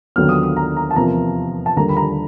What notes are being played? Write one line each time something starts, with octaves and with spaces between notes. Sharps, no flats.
D#2 D3 F#3 B3 F6
D#6
D#6
A#5
A#5
A5
E2 C3 F3 A#3 A#5
A5
D#2 D3 G3 A#3 A#5
B5
A#5